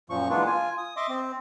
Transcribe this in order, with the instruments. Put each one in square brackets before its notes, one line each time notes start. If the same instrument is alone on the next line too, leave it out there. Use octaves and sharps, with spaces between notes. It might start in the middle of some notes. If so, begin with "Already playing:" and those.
[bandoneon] F#2 A#2 F3 C#6
E3 G#3 A#3 B3 D4 F4
F4 G#5
D#6
D#5 E5 C6 D6
C4